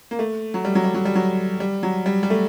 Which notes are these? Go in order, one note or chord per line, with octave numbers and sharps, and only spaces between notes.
A#3
A3
F#3
G3
F#3
G3
F#3
G3
F#3
G3
F#3
G3
G3
A3